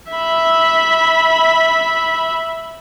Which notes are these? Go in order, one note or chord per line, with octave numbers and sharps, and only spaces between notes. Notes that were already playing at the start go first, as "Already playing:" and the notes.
E5 B5